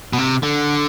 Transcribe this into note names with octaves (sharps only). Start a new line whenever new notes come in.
B2
C3
D3